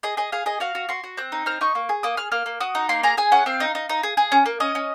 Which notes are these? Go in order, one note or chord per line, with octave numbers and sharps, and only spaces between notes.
G#4 D#5
G#4 D#5
G#4 F5
G#4 D#5
F#4 F5
F#4
F#4 C6
F#4
C4 F#6
D#4
C4 F6
D#4 C#6
A#3
G#4
A#3 D#6
G#4 F6
A#3 F6
A#3
F#4 D#6
D#4
A#3 C6
G#4 A#5
G#4 G#5
C#4 F#5
C4 F5
D#4
D#4
D#4
G#4
G#4
C#4
A#3
C#4 D#5
C#4